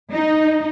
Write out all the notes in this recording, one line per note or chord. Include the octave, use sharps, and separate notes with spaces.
D#4